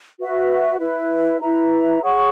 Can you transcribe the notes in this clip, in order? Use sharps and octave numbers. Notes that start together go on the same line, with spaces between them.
F#4 B4 E5
E4 B4 E5
E4 B4 E5 A#5
G#4 C#5 F#5 C#6